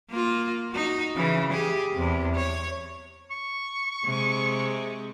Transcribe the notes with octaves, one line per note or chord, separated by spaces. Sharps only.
A#3 F4
D#4 F#4
C#3 E3
G4 G#4
E2 C3
C#5
C#6
C3 G#3